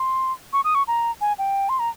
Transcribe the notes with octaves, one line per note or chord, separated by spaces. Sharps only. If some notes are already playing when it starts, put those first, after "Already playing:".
Already playing: C6
C#6
D#6
C#6
A#5
G#5
G5
C6
A#5